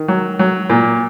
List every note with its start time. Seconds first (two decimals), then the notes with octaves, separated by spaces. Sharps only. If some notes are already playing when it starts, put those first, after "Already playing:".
Already playing: D#3
0.08 F#3
0.39 F#3
0.70 A#2